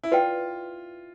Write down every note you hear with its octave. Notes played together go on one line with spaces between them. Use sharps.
E4
F4 B4 D5 G5